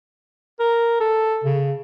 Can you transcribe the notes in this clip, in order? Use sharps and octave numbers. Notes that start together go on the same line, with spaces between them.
A#4
A4
C#3